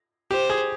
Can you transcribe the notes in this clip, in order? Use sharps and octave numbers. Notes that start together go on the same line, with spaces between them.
G4 C5
G#4